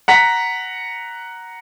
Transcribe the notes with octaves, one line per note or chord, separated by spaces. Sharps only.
F#5 A#5 B6